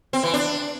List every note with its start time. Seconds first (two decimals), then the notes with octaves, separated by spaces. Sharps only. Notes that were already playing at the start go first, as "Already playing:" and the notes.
0.13 C4
0.23 E3
0.34 D4